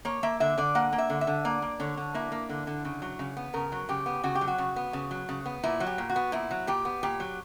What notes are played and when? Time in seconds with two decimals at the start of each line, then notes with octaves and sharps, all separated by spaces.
0.05 A#3 C#5
0.23 A#3 E5
0.40 D3 E5
0.58 D3 D5
0.75 A#3 F#5
0.93 A#3
0.98 E5
1.10 D3
1.21 E5
1.27 D3
1.45 A#3 D5
1.62 A#3
1.80 D3 C#5
1.97 D3
2.14 A#3 E4
2.32 A#3
2.49 D3
2.67 D3
2.85 C#3
3.02 F#3
3.19 C#3
3.37 B3
3.54 C#3 A#4
3.72 F#3
3.89 C#3 G4
4.06 B3
4.23 C#3 F#4
4.35 G4
4.41 F#3
4.48 F#4
4.58 C#3
4.76 B3
4.93 C#3
5.11 F#3
5.29 C#3
5.46 B3
5.64 A#2 E4
5.80 F#3
5.86 G4
5.98 A#2
6.10 F#4
6.16 B3
6.32 A#2 E4
6.51 F#3
6.67 A#2 G4
6.85 B3
7.03 A#2 G4
7.20 F#3